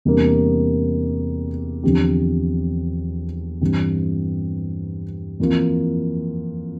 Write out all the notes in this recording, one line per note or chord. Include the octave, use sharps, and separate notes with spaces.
E2 C3 G3 A#3 D4
E2 D3 F3 C4 G4
G2 E3 G3 C4
F2 E3 A#3 F4